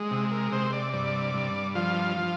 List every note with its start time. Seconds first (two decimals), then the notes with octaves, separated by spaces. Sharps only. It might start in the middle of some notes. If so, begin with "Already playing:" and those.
Already playing: G#3
0.11 C3
0.32 A#4
0.52 C3 C5
0.73 D5
0.93 G2 D5
1.34 G2
1.75 F3 F5
2.17 F3